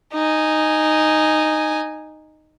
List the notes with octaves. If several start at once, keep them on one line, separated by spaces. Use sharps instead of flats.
D#4 G#5